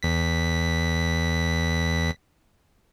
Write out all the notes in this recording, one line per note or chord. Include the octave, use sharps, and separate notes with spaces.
E2 B6